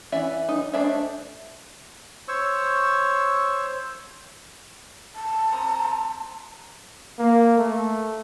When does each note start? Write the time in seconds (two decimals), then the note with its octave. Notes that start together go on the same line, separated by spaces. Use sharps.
0.12 E3 C#4 D5 E5
0.48 D#4
0.73 A3 D4 C5 D5 E5
2.28 C5 C#5 C#6 E6
5.15 A5
5.52 C4 A#5 D#6
7.19 A#3
7.58 A3